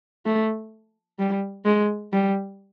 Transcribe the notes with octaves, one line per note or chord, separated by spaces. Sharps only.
A3
G3
G#3
G3